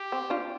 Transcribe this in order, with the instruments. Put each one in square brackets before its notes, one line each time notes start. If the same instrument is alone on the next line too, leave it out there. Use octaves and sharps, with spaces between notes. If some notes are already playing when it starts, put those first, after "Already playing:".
Already playing: [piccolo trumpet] G4
[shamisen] C4
D4 F4